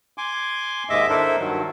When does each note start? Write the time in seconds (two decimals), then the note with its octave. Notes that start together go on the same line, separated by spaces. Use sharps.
0.18 G#5 C6 D6
0.89 D#2 G#2 G#3 D#5 E5 D6
1.09 D4 E4 A4 A#4 C5 E5
1.39 G2 D#3 F#3